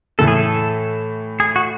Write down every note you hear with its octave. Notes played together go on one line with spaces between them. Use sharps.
A2 E3 A3 A4
G#4
A4
G#4
F#4